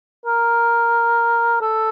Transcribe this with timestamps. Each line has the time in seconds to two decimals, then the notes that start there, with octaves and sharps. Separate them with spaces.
0.26 A#4
1.61 A4